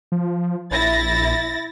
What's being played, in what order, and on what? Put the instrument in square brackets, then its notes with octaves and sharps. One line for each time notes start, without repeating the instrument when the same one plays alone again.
[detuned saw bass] F3
[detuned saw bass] A#1 [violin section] E4 A6 A#6